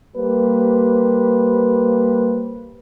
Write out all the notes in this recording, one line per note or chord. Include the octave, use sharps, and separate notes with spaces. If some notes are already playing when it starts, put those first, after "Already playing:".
G3 A#3 B4 C5